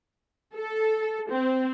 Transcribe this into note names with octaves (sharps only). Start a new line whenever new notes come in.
A4
C4